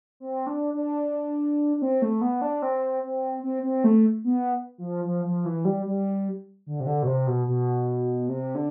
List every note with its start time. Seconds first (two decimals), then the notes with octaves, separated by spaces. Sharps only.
0.20 C4
0.47 D4
0.74 D4
1.77 D4
1.82 C4
2.02 A3
2.21 B3
2.42 D4
2.62 C4
3.03 C4
3.43 C4
3.63 C4
3.84 A3
4.24 B3
4.78 F3
5.05 F3
5.25 F3
5.45 E3
5.65 G3
5.86 G3
6.67 D3
6.80 C3
6.86 D3
7.03 B2
7.07 C3
7.27 B2
7.47 B2
8.29 C3
8.55 D3